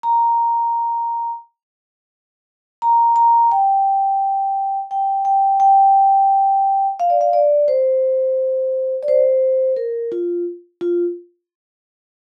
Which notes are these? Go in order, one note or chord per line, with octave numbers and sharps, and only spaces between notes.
A#5
A#5
A#5
G5
G5
G5
G5
F5
D5
F5
D5
C5
D5
C5
A#4
F4
F4